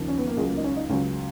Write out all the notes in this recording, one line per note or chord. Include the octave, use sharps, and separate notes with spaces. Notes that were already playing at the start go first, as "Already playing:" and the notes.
Already playing: D#2 C#3 F3
C#4
B3
A#3
C#2 C#3 F#3 G#3
A#3
D#4
C#4
D#4
C#2 C#3 F#3 C#4